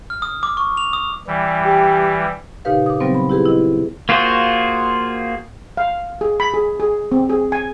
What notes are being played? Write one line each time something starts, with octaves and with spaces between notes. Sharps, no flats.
F6
D#6
D6
C#6
F7
D#6
E3 G3
G4
A#2 C#3 D#4 G4 B4 F5
D6 D#6
C#3 F#3 G3 B3 C4 C5
B5
E4 G4 G#4 B4
E4 D#5
A#3 F4 F#4 G#4 C5
F5
G#4
B5
G#4
G#4
C4
G#4
G#5